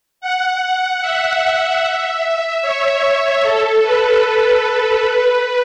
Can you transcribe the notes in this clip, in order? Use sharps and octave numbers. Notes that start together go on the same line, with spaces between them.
F#5
E5
C#5
A4
B4
A4
A4
B4